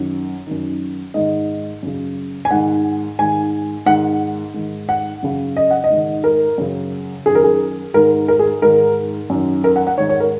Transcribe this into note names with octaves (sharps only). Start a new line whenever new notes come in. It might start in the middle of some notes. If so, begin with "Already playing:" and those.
Already playing: F#2 D#3
F#2 D#3
G#2 D#3 D#5
F#2 C#3
G#5
G#2 D#3 F#5
G#2 D#3 G#5
G#2 D#3 F#5
G#2 D#3
F#5
F#2 C#3
D#5
F#5
D#5
G#2 D#3
A#4
F#2 C#3
F#2 D#3 G#4
A#4
G#4
G#2 D#3 A#4
A#4
G#4
G#2 D#3 A#4
F#2 D#3
A#4
F#5
F#5
G#2 D#3 C#5
C#5
A#4